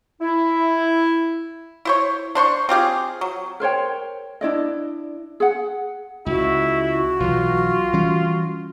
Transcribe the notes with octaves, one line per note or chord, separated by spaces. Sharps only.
E4
E4 C5 C#5
D4 C5 C6 C#6
C4 F4 G4 G#4
F#3
A#4 C5 C#5 G5
D4 E4 D5 D#5
G#4 F#5
C#2 E4 F#4
B1 E3 F#3 F4
E3 G3 C#4